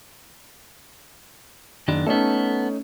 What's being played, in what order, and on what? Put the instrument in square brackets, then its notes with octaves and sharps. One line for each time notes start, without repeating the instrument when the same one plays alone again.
[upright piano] F#1 [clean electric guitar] D#3 D4
[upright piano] A3 C#4 D#4 [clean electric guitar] B3 A4